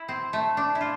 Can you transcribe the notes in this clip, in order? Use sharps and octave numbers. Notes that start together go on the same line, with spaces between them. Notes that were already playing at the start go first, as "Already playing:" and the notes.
Already playing: E4
C4
A3
D4
E4
F4